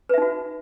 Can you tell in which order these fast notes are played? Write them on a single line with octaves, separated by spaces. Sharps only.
B4 E5 D#4 F#4